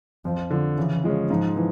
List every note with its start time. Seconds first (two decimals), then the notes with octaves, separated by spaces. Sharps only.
0.25 F2 F3
0.50 D3 F3
0.77 C#3 E3
1.04 F3 G#3 C#4
1.29 G#2 F3
1.56 E3